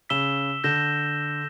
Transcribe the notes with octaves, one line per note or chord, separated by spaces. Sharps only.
C#3 E6 B6 E7 G7
D3 G6 A#6 E7 G7